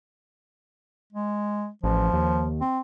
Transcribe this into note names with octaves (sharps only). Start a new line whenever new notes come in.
G#3
A1 F3
D#2
C4